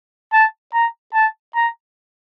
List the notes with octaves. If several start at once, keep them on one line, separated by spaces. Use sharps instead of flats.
A5
A#5
A5
A#5